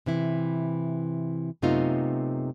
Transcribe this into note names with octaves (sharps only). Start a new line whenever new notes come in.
C3 E3 E4
F#2 C3 A3 B3 D#4 F4